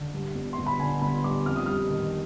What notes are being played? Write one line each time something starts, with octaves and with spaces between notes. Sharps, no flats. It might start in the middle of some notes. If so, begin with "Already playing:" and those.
Already playing: D3
G2
G1
C6
G1
B5
D3 G#5
G1 B5
G2 D6
F2 F6
D#6
G3 F6
D#3